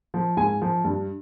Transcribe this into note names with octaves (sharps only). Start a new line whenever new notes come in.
F3
G#2 G#5
F3
G2